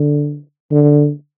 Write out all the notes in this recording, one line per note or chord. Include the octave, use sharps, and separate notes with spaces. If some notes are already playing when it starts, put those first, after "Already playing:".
Already playing: D3
D3